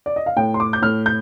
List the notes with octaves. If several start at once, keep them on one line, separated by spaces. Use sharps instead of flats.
D5
D#5
F5
A2 G5
C6
D6
G6
A2 F6
G6